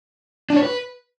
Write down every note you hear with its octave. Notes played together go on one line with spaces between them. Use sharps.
D4
C#5
B4